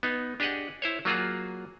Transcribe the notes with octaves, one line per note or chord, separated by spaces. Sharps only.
B3 D#4
D4 G4 G#4 D#5 F#5
E4 C5 C#5
F#3 A#3 F4 F#4 G#4